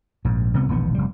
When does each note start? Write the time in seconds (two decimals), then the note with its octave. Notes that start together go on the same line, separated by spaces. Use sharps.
0.25 A#1 G#2
0.54 C2 C3 B3
0.69 E1 A#1 D#3 B3
0.95 F1 G3